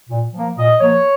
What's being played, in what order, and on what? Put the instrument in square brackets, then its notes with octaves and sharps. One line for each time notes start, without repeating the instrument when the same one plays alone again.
[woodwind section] A#2
F3 A#3
A#2 D#5
F3 A#3 C#5